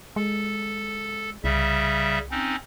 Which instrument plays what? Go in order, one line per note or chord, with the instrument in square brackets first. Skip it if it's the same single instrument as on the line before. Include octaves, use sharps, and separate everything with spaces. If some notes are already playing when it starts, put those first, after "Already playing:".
[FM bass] G#3 [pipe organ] A4
[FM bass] C2 [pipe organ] C#3 G3 E5
[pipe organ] C4 C#4 D#4